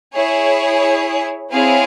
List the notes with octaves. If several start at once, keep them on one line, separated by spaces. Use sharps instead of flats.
E4 G#4 C#5
C4 E4 G#4 C#5 F5